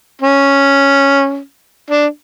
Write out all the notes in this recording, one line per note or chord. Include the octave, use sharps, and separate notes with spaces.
C#4
D4